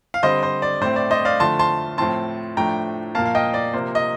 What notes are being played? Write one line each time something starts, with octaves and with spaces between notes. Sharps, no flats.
F5
D3 G3 C4 C5 D#5
C5
D5
A2 A3 C4 C5
D5
C5 D#5
D5 F5
D3 F3 A3 A5 C6
A5 C6
A2 F3 C4 A5 C6
A2 F3 A3 D4 G5 A#5
A#2 F3 A#3 F5 A5
F5
D#5 G5
D5
C3 F3 A#3 C5
D#5